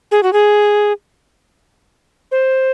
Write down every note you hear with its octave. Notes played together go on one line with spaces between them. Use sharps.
G#4
F#4
G#4
C5